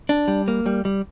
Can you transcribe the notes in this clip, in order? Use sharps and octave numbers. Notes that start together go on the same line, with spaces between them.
D4
G3
A#3
G3
G3